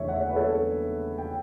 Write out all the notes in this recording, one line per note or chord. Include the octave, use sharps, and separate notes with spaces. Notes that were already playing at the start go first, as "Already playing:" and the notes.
Already playing: F#1 E2 D3 A3 C#5 E5
F#5
C#5 E5
B4
A4 C#5
G5